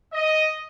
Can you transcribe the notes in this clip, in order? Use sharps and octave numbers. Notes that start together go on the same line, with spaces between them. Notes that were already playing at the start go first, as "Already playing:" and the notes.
D#5